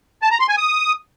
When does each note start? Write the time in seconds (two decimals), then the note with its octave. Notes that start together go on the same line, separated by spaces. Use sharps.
0.22 A5
0.31 A#5
0.40 C6
0.49 G#5
0.57 D#6